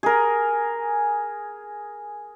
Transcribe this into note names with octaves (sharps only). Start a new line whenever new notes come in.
G#4 A#4